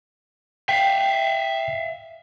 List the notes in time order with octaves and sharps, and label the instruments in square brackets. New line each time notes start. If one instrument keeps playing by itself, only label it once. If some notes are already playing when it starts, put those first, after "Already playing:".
[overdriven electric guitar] E5 F5 [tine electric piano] G5